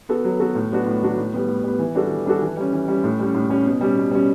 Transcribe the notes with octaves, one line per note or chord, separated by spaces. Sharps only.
B3 F#4 A4
F#3
B3 F#4 A4
A2
F#3 B3 D4 F#4
A2
F#3 B3 D4 F#4
A2
G3 B3
A2
G3 B3
E3
G3 D4 F#4 A4
E3
G3 D4 F#4 A4
E3
G3 C#4
E3
G3 C#4
A2
G3 C#4
A2
G3 C#4
B2
G3 C#4
B2
G3 C#4